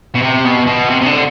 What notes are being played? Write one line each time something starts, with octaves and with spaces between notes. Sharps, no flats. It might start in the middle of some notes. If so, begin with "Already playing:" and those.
B2
C3
B2
B2
C3
C3
D3